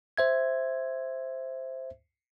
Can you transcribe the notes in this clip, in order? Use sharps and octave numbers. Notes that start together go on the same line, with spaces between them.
C5 E5 G#6